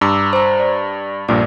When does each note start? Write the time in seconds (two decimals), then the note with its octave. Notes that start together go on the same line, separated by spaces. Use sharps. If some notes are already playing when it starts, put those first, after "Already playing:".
0.01 G2 A#5 D6 E6
0.33 C5 A#5
0.60 D5
1.29 A#1 G2 A#2 D5